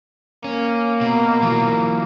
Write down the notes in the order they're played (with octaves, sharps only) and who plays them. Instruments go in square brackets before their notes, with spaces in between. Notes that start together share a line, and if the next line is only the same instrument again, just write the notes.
[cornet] A#3 [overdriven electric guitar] C#4
[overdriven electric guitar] B2
E3 F#3